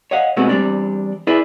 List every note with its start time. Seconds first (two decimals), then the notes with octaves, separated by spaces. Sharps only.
0.11 C#5 D#5 F5 F#5
0.36 B2 G#3 A3 B3 C4 F#4
0.49 E2 G#2 G3 C4 D4
1.27 E4 G#4 B4 D5 E5